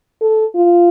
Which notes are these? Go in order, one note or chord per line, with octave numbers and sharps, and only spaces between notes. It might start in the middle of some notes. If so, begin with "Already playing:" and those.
A4
F4